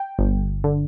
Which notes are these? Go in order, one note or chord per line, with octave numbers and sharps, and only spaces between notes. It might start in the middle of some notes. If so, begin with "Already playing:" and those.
Already playing: G5
G1
D3